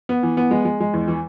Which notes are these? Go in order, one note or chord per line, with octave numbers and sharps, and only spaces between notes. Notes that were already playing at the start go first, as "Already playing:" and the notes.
B3
E3
B3
G#3
G#3
G#3
E2
E3